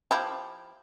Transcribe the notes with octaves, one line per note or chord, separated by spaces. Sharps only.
F3 E4 G4